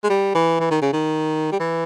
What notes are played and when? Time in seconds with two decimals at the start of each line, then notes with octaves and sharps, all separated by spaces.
0.04 G#3
0.10 G3
0.35 E3
0.60 E3
0.70 D#3
0.82 C#3
0.93 D#3
1.52 G3
1.60 E3